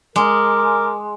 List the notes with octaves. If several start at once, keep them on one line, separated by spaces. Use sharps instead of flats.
G#3 A#4 D6